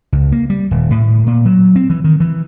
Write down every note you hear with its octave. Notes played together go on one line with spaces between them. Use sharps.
C#2
A#3
G3
D#1
A2
A#2
F#3
C4
E3
D#3
E3